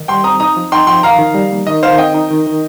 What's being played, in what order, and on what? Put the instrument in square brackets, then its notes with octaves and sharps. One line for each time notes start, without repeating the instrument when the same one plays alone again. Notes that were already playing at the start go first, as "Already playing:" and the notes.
Already playing: [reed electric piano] D#3 D#4
[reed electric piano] G3 [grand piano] G5 C6
[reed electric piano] C4 [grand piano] A#5 D#6
[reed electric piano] D#4 [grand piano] A#5 D#6
[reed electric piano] F3
[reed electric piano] D#4 [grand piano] G5 C6
[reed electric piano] F3 [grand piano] G5 C6
[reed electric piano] D#3 [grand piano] F5 A#5
[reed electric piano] D#3
G3
A#3
[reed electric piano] D#3 [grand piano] D#5
[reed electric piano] D#3 [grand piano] C5 F5
[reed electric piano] C4 [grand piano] D#5 G5
[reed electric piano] D#4
D#3
D#3